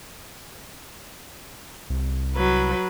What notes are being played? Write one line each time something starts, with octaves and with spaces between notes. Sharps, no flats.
C2
F#3 B4